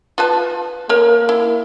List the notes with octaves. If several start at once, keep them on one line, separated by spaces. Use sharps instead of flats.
F4 B4 A5
A#3 A#4 C#5
E4